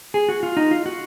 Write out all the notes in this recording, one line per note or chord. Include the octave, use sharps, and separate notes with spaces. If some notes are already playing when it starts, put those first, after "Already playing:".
G#4
F#4
F4
D#4
F4
F#4